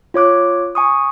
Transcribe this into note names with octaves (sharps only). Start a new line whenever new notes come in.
F4 C#5 D6 F#6
G#5 C#6 D#6